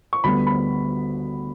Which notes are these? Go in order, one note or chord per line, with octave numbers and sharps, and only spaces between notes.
C#6
D2 D3 G3 B3 B5
B5